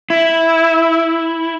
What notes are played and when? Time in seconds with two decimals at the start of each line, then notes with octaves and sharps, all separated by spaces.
0.10 E4